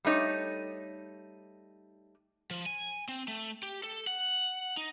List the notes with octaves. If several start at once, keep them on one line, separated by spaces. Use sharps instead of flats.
G3 A3 D#4 C#5
F3
G#5
C4
A3
G4
A4
F#5
D#4